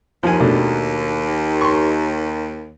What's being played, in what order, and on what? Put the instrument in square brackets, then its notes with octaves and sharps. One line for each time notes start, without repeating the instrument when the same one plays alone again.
[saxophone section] D#2 [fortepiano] F3 G#5
[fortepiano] B2 A3 D4
C6 C#6